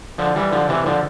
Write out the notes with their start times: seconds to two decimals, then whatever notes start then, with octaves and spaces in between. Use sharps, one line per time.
0.18 D3 F3
0.36 E3 G3
0.52 D3 F3
0.69 C3 E3
0.86 D3 F3